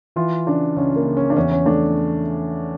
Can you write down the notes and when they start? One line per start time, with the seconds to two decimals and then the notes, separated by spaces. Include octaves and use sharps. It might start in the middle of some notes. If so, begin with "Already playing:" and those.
0.16 E3 F4
0.46 C#3 D4
0.76 C#2 C#4
0.96 A#3
1.06 C#3
1.17 C#4
1.30 D4
1.36 E2 C#4
1.52 C#4
1.65 A3 D4